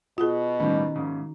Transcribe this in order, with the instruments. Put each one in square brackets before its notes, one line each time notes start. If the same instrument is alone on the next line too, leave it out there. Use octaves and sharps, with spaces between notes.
[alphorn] B2 [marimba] F4 G#4 [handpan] F#4
[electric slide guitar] A2 G3 [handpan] D#3 D#4 [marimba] C#4
[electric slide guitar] G#2 C#3